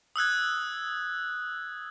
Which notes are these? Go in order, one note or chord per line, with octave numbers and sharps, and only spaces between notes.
D#6 E6 F#6 G#6